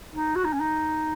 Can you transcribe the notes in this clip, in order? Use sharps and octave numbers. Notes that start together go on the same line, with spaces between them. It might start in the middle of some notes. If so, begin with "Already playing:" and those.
D#4
F#4
D#4
C#4
D#4